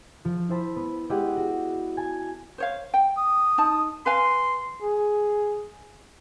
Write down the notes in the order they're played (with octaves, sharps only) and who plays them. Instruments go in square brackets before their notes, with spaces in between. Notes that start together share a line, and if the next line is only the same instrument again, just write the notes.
[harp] F3
E4 C5 A5 B5
B3
G#3 E4 G4 D5 D#5 F#5
F#4
G#5 A5
[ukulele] C5 C#5 F5
G5
[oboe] D#6
[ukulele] D#4 A5
[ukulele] B4 F5 G#5 [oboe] C6
[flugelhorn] G#4